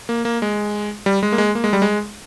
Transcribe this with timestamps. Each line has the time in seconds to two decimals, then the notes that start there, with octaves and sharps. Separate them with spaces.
0.09 A#3
0.25 A#3
0.42 G#3
1.06 G3
1.23 G#3
1.32 A#3
1.38 G#3
1.55 A#3
1.64 G#3
1.73 G3
1.82 G#3